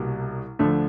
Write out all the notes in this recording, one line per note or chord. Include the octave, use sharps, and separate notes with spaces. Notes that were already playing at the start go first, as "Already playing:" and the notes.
Already playing: C2 B2 G3 A#3
D2 D3 F3 A3 D4